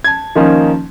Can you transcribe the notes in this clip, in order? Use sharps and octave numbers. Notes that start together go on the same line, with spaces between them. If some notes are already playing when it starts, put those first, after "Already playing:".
A5 G#6
D#3 F3 A#3 C#4 D#4